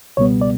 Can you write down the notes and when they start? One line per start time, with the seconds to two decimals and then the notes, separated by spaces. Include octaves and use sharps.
0.17 C#2 B2 G3 B3 C#5
0.41 D5